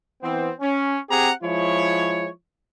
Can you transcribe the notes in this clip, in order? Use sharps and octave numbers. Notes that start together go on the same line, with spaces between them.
E3 B3 C4
C#4
C4 G4 G#4 F#5 A#5
F3 G#3 E4 C#5